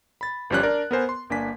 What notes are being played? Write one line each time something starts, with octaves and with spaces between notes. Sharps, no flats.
B5 A6
G1 F3 G3 C#4 F#6
D4 A#4 D5
B3 A#4 C5 G#5
C6
G1 A#3 D4 G#5 B6